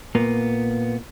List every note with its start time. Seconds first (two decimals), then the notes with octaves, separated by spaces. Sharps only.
0.15 A#2 A#3 B3